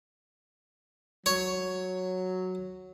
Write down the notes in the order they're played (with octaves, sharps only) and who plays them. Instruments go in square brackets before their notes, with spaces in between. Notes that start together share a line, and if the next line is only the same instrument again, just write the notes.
[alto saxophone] F#3 [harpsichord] C#5